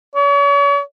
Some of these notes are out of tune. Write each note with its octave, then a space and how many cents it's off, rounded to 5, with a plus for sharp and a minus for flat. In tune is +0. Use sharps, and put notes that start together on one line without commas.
C#5 +40